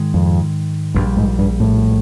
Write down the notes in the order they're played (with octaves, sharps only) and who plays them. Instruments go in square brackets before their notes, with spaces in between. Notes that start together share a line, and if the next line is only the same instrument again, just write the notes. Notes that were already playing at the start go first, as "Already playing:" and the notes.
Already playing: [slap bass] G#2 D#3 G#3
[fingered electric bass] F2
[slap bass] A#1 A#2 G3 [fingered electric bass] G2
[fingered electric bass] G#2
G2
A2